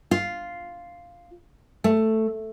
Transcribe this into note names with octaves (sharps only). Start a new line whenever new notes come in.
F4
A3